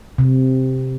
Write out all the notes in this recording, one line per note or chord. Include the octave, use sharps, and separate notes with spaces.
C3